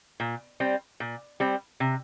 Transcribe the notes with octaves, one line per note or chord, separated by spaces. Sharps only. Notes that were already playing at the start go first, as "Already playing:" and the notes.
A#2
G3 C4
A#2
G3 C4
C3